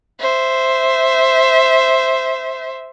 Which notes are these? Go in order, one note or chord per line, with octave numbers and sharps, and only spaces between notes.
C5 E5